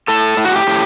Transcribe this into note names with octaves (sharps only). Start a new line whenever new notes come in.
A2 A4
A2
F#4
G4
A2